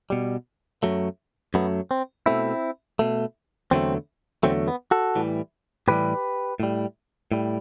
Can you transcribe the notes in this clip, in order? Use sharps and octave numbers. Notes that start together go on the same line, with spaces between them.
B2 G3
F#2 F#3 A3
F#2 F#3 A3 B3
C4
B2 A3 C4 E4
B2 A3
E2 D3 F#3 A3 C4
E2 D3 F#3 A3 C4
B3
F#4 A4
A2 E3 G3
A2 E3 G3 G4 B4
A2 G3
A2 G3